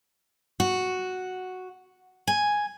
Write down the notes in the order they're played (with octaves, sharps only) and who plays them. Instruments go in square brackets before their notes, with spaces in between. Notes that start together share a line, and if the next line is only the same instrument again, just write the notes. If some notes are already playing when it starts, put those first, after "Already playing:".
[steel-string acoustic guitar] F#4
G#5